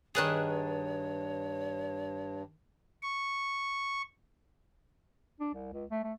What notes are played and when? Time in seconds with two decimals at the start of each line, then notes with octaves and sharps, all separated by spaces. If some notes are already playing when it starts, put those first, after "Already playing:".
0.15 G2 D#3 D4 G#4 B4 C#5 F#6
3.03 C#6
5.40 D4
5.54 C2
5.73 C#2
5.90 A3
6.04 A3